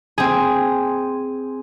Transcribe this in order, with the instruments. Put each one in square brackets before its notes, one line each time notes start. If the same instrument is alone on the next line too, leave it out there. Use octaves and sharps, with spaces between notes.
[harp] C4 G#4